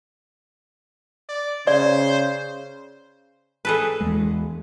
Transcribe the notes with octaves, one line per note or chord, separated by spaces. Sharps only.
D5
C#3 C5 D5
G#4 A4 B4
E2 E3 G#3